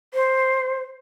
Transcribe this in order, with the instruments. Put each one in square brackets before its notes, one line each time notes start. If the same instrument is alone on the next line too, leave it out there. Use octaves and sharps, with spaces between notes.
[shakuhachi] C5